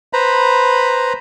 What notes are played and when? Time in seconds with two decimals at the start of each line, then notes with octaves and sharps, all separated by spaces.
0.13 B4 C5 A#5 B5